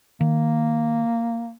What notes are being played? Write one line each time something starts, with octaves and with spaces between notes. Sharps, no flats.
D#3 A#3